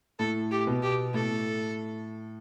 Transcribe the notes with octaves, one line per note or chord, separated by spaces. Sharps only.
A2 A4
G4
B2
G4
A2 A4